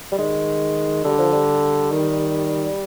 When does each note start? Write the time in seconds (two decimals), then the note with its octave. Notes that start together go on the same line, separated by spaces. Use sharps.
0.12 G3
0.18 D#3 G#3
1.05 D3 G3
1.19 F3
1.33 G3
1.91 D#3